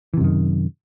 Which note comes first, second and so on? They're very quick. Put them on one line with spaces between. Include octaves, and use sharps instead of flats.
E3 C3 F#2 D#3